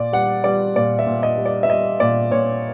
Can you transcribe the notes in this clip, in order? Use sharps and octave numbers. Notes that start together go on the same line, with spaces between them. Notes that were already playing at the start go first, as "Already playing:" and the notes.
Already playing: A#2 D5
G3 F#5
G3 D5
A#2 D5
E5
A#2
D#5
G3
D5
E5
G3 D#5
A#2 D5
A#2 C#5